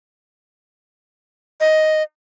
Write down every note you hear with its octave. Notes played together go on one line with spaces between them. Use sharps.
D#5